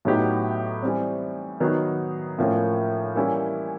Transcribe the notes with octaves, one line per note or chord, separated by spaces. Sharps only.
A2 F#3 B3 D#4 G4
E3 G3 C4
D#3 F#3 B3 D#4
A2 F3 A#3 C#4
E3 G3 A#3 C#4 E4